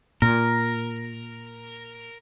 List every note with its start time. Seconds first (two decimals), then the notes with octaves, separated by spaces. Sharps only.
0.22 A#2 A#4